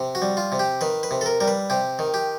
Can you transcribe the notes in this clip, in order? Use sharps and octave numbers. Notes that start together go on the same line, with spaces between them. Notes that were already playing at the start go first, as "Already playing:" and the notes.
Already playing: C3
F#4
G3
F4
C3
G4
D#3 B4
B4
C3
A4
A#4
G3 A#4
B4
C3 G4
D#3
G4